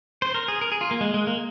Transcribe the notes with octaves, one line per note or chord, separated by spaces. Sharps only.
C5
A#4
G#4
A#4
G#4
F4
A#3
G#3
G#3
A#3